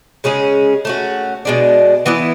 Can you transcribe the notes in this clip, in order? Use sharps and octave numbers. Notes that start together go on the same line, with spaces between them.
C#3 G#3 C#4 G#4
A3 C#4 F#4
B2 G#3 D4
E3 B3 E4